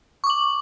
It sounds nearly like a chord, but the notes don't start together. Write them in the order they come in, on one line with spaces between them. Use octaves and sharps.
C#6 D6 F#7